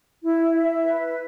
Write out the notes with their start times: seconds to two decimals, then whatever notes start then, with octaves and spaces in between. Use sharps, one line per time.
0.23 E4
0.54 E5
0.85 B4